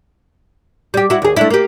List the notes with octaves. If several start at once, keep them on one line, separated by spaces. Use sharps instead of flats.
G3 G4
E4 F#4
D#2 G#4
A3 D4 E4
A#3 G4